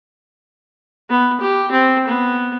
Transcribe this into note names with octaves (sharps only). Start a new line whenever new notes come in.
B3
G4
C4
B3